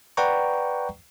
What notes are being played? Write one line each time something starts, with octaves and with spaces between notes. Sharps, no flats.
B4 D5 F#5 G5 A#5 C#6